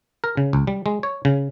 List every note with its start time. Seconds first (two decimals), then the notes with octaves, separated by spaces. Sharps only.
0.24 A#4
0.37 C#3
0.53 C#2
0.67 G3
0.86 G#3
1.03 C#5
1.25 C#3